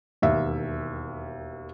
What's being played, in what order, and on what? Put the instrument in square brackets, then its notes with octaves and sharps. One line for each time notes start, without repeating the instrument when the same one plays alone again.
[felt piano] E1 D#2 E5